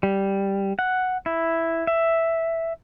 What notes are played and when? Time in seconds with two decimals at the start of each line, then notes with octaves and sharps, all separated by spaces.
0.03 G3
0.79 F#5
1.26 E4
1.87 E5